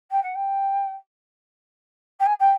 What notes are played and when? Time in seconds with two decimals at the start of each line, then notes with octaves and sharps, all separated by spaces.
0.11 G5
0.23 F#5
0.35 G5
2.19 G5
2.26 G#5
2.40 G5